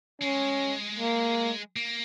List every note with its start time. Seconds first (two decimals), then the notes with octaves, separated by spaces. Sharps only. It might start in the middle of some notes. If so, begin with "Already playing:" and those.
0.21 G#3 C#4
0.99 A#3
1.76 A#3